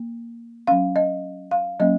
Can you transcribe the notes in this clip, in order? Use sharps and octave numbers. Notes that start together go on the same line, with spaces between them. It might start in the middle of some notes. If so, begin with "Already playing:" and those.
Already playing: A#3
F#3 C#4 F5
D#5
F5
F#3 A#3 C#4 D#5